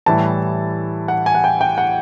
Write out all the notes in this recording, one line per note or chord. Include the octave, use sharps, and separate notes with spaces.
A2 E3 G3 A5
F#5
G#5
F#5
G5
G5
F#5